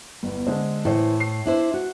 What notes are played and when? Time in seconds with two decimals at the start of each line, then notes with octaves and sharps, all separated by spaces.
0.23 G1 E2
0.47 D3 G#3 C5
0.85 A2 E3 C5
1.20 C7
1.45 D4 E4 C5
1.74 F#4